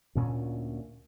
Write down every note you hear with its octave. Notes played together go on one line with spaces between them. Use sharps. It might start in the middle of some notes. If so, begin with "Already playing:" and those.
D2 A#2 C#4